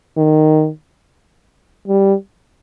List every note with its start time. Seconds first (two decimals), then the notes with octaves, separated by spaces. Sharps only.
0.17 D#3
1.88 G3